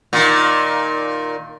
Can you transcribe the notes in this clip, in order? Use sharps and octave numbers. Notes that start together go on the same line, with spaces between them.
A#2 D#3